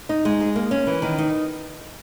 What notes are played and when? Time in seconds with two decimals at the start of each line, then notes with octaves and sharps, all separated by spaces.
0.09 D#4
0.25 G#3
0.41 G#4
0.56 A#3
0.71 C#4
0.87 E3
1.02 D#3
1.18 D#4